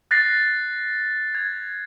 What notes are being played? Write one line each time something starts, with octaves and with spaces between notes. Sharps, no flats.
F#6 A6 A#6 C7
G#6